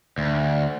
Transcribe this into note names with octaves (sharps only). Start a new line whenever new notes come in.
D2